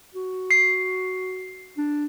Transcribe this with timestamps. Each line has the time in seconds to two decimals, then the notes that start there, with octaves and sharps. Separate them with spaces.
0.14 F#4
0.51 C7
1.77 D4